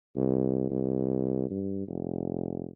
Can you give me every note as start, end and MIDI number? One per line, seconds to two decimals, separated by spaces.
0.16 0.69 36
0.70 1.48 36
1.51 1.84 43
1.88 2.67 29